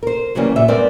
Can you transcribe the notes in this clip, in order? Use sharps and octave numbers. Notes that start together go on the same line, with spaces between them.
A#4 C5
C#3 E3 F#3 G3 A#3 C#4
A#2 E5
G2 G#3 B3 C4 A#4 D5